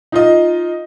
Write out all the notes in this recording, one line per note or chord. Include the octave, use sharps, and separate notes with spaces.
D#4 F4 D#5